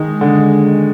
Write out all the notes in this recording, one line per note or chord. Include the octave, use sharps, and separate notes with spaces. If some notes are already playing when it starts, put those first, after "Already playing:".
Already playing: D#3 G#3
D3